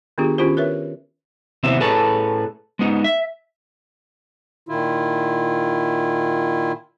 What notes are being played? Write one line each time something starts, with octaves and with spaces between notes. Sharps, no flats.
D#3 B3 D4 F4 G4 G#4
D#3 C#4 E4 F4 G4 C5
A#4 B4 C#5 E5
D#2 C3 E3 B3 C4 E5
A2 G#4 A4 B4 C#5 A5
G#3 B3 D#4
E5
A#2 D#3 E4 F4